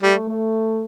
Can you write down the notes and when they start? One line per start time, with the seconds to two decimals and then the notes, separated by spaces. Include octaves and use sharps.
0.02 G3 A3
0.29 A3